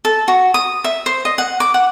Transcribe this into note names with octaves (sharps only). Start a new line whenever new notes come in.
A4
F#4
D#6
E5
C5
D#5
F#5
D6
F#5